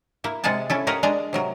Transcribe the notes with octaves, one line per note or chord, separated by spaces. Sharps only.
A#3 E4
C3 G#3 F4 F#5 G#5 A5
C#4 E4 A4
G4 A#4 C#5 D#5 F5 F#5
G#3 D4 D#5 G#5 A#5
C3 F#3 A#4